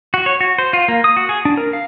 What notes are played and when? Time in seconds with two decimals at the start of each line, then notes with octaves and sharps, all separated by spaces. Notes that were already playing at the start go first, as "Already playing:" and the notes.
0.14 F#4
0.26 C#5
0.41 F#4
0.58 C5
0.73 F4
0.88 A#3
1.04 D#6
1.17 F#4
1.29 G#4
1.45 D4
1.57 A#4
1.73 F5